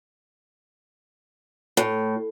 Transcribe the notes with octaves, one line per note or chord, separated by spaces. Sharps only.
A2